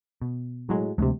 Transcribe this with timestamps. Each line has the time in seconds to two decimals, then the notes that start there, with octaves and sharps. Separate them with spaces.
0.21 B2
0.69 A2 F#3 G#3
0.98 D2 C3 F3 G#3 A3